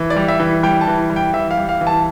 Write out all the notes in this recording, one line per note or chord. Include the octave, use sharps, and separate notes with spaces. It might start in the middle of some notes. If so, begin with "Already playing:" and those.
Already playing: E3
D5
G3
E5
E3
G3 G5
A5
E3
G3
G5
E3 E5
F5
G3
F5
E3
A5